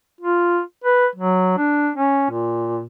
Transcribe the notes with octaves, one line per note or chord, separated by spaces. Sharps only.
F4
B4
F#3
D4
C#4
A#2